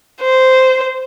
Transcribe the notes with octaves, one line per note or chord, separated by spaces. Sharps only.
C5